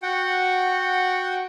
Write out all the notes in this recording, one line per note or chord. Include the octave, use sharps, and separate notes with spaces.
F#4 F#5 G5